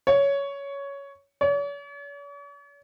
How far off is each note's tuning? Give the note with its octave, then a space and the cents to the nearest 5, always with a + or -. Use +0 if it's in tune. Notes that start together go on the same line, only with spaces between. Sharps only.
C#5 +10
C#5 +45